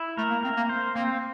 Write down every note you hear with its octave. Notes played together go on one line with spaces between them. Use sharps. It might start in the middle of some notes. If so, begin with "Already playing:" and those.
Already playing: E4
A3 A#4
A#3
C4 A#4
A#3
C5
A#3 C4